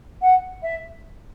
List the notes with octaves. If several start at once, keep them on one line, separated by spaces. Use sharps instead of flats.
F#5
E5